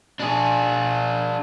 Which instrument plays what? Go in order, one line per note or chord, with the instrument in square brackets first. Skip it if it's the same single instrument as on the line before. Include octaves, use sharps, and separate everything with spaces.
[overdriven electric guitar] D4 G#4